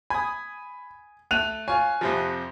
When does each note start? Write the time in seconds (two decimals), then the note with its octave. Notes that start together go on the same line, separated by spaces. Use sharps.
0.10 G#5 B5 D#6
1.31 A3 F#6 D#7 F7
1.68 F4 C#5 G#5
2.01 F2 C3 F3